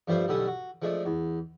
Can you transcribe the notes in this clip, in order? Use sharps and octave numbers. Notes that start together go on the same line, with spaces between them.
G2 F3 G3 A3 C5 C#5
B1 D3 G3 C#4 A4 D#6
F#4
F3 G#3 A3 D4
E2